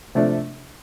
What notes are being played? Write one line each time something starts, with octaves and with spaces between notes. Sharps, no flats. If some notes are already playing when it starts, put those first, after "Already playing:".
C3 F3 A3 D4